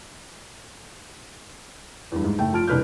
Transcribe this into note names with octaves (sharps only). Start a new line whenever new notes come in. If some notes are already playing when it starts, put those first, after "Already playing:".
E2 G2
G#2
F#1 A3 G5
F3 A5 F6 D7
E1 C2 B4 F6 G6